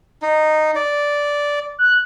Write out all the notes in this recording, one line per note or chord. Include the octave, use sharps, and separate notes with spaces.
D#4
D5
F#6